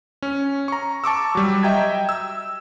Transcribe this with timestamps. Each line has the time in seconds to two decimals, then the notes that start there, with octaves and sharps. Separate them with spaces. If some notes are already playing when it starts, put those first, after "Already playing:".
0.22 C#4
0.68 A#5 C#6
1.04 A5 C#6 D6 E6
1.35 F#3 G3
1.63 D#5 E5 G5 A#5 G#6
2.09 E6